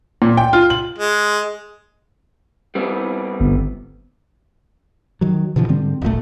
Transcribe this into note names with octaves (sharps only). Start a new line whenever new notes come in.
A#2
G5
F4
F#7
G#3
G3 B3 C4
G1
D#3 F#3
B2 D3 E3 F3
G#2 D3 G3 C4
D#1 G#1 A#2 A3